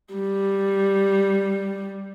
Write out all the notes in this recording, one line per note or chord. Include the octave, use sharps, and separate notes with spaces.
G3